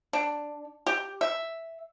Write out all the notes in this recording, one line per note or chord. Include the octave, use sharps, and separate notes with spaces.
D4
G4
E5